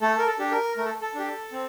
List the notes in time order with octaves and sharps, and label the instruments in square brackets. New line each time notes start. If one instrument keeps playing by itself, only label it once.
[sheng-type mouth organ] A3 A4
A#4
A4
D4 G4
A#4
A3 A#4
A4
A4
D4 G4
C4